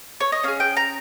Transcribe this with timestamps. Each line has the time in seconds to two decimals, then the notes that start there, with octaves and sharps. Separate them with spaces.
0.20 C#5
0.32 D#5
0.43 C#4 G#4 F5
0.60 G5
0.77 A#5